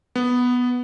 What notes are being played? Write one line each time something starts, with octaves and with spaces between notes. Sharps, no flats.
B3